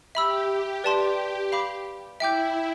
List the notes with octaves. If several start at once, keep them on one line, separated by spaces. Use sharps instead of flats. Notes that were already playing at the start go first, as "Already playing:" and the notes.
G4 E5 B5 E6
B4 D5 A5 C6
F5 B5 D6
E4 E5 G5 D6 G6